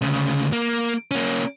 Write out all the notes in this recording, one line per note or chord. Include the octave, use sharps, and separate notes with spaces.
D2 C#3
A#3
A#3 C#4